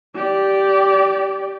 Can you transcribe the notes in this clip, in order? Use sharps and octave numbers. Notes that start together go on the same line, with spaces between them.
G4 D5